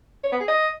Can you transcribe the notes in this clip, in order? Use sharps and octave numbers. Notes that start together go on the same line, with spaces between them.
C#5
B3
G#4
D#5